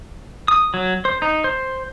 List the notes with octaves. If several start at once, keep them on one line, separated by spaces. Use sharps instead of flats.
D#6
F#3
C5
D#4
C5